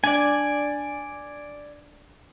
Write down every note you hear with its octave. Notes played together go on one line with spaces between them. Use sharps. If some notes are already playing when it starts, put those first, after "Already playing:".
D4 D5 G#5